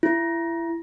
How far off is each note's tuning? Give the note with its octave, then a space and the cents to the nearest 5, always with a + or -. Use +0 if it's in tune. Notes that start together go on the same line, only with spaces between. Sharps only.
E4 +25